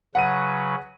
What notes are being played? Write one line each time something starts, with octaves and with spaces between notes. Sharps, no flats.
C#3 F#3 B4 F#5 D#7